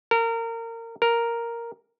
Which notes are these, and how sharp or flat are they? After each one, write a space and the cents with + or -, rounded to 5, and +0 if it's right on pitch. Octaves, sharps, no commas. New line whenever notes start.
A#4 -25
A#4 +0